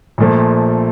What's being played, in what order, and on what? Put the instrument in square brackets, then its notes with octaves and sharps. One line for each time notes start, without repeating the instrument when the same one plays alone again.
[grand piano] A#1 A#2 F3 A3